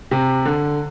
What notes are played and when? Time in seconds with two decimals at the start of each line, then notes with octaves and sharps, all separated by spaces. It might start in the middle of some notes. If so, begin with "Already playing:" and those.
0.11 C3
0.45 D3